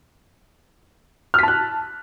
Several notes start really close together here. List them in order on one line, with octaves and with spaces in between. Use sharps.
F6 B6 A5 F#6